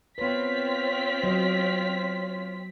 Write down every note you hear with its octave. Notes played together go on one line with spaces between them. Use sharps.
B3 C4 F4 B4 C#5 B6
F#3 D#5